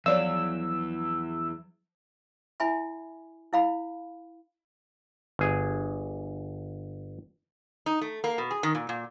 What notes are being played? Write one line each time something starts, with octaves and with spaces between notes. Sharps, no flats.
E2 F3 F#3 C#5 D5 F5 E6
E4 E5 G#5 B5
E4 F5 B5
G1 G#4
D#4
A3
A#3
B2
G#4
D#3
A#2
A#2